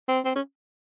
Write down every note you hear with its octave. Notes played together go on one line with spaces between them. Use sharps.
C4
C4
C#4